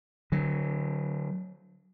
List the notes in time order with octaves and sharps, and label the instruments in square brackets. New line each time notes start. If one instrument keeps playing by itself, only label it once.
[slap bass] D3 F#3